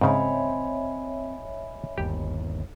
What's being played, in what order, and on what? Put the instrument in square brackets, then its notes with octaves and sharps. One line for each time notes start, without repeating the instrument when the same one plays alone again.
[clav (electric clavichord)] G#2 C#3 [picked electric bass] C4 [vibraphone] C#5 E5 [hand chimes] D#5 G#5 B5
[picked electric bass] G1 D#2 [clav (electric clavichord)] G4